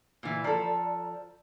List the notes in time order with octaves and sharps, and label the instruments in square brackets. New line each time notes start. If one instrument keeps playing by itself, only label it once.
[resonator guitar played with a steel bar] A#2 E3
[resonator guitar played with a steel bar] F3 A4 [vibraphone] D5 A5 A#5